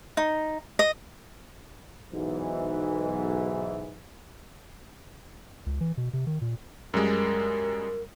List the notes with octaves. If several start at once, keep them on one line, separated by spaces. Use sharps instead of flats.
D#4
D#5
B1 G#2 E3
C#2
E3
B2
C3
D#3
A#2
F#2 G3 G#3 A#4